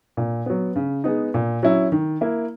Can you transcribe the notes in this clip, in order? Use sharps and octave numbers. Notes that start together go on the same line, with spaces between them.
A#2
F#3 B3
C#3
G#3 B3 D#4
A#2
F#3 C#4 E4
D#3
A#3 E4